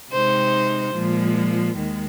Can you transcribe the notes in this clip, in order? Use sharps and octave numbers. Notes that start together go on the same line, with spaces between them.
C3 G#3 D#4 C5
A#2 F3 G#3
D#2 D#3 G#3